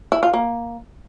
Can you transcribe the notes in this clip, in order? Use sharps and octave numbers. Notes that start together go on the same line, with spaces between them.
E4
F4
A#3